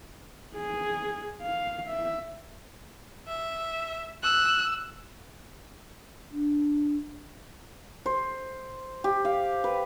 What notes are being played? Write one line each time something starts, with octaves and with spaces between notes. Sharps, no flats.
G#4
F5
E5
E5
E6 F#6
D4
C5
G4
F5
B4